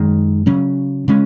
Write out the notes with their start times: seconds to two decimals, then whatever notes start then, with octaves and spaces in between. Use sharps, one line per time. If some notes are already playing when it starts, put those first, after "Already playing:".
Already playing: F#2 D#3 G#3
0.46 C#3 F#3 C#4
1.08 C#3 G#3 C#4